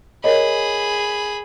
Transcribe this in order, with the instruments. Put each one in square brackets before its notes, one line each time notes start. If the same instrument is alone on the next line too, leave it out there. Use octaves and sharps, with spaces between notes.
[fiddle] G#4 B5 [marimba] A#4 C#5 D#5